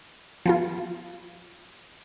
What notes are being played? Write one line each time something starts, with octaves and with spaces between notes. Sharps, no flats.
F3 B3 F4